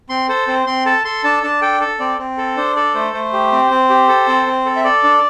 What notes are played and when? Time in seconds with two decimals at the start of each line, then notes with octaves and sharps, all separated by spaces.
0.09 C4 C6
0.29 A4 C5
0.48 C4 C5
0.66 C4 C6
0.86 A4 A5
1.05 A4 C6
1.24 D4 A5
1.43 D4 A5
1.62 A4 G5
1.81 A4
2.00 C4 D5
2.19 C4
2.38 A4
2.57 D4 C5
2.76 A4 D5
2.95 A3 C5
3.13 A3 C5
3.33 G4
3.52 C4
3.71 C4
3.89 G4
4.09 A4
4.28 C4
4.47 C4
4.66 A4
4.76 E5
4.84 A4 D5
5.04 D4